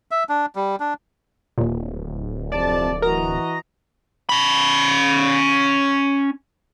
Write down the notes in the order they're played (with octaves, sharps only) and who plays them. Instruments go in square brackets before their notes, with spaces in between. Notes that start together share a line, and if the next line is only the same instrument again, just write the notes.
[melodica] E5
D4
G3
D4
[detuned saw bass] D1 [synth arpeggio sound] D#2 A#2
[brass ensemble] F2 C3 A5 [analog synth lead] D5
[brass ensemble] E3 F#4 D#5 [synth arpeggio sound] A#4 [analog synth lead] A#5
[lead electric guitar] C#4 B5